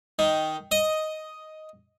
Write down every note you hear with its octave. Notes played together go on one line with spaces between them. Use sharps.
D#3
D#5